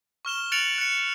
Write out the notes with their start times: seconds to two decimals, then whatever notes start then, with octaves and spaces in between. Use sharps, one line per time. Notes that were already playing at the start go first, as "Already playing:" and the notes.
0.25 C#6 F6 E7 G7
0.52 F#6 A6 C#7 D7 F7 F#7
0.78 F#6 C#7